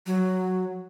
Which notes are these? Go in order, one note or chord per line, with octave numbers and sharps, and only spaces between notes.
F#3